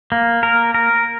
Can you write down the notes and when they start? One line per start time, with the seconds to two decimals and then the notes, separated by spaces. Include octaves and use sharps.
0.12 A#3
0.43 A#4
0.74 A#4